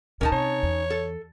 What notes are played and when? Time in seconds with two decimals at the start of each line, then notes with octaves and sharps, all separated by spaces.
0.21 D2 A2 C#4 D#4 A#4 A5
0.32 C3 C#5
0.63 E2
0.90 A4